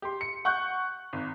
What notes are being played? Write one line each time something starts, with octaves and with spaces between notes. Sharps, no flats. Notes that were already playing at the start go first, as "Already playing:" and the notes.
G4 C6
C#7
F#5 C#6 F#6 G6
G#1